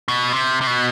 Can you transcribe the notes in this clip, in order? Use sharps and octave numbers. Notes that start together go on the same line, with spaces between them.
B2
C3
C3
B2